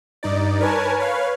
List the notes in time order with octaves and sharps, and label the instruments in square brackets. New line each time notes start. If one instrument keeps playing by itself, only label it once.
[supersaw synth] G2 D#4 D5
A#4 B4 C#5 G#5 A5
B4 C#5 F5